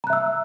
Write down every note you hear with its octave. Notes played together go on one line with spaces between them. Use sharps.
E5 A#5 E6 F#6